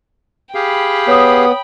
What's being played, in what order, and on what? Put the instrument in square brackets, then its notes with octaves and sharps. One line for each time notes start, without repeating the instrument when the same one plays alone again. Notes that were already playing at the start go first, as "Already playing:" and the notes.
[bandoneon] G4 G#4 F5 [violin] G5 B5
[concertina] B3 [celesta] C#5 D#6